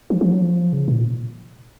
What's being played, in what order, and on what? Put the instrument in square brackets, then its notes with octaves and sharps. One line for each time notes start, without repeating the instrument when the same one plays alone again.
[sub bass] F3
F3
F#3
F3
C#3
A#2